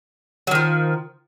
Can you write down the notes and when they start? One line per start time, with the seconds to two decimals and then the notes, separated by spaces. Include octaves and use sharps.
0.47 F#3
0.51 D#3
0.55 F3